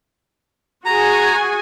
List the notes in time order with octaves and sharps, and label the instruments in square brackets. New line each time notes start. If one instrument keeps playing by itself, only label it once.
[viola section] F#4 G#4 G#5 [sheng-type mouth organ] A#5